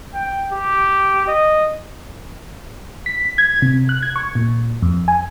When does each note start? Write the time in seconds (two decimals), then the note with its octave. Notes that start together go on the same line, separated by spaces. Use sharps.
0.14 G5
0.52 G4
1.27 D#5
3.06 B6
3.38 G#6
3.62 C3
3.89 F#6
4.03 G#6
4.16 C#6
4.35 A#2
4.82 F2
5.08 G#5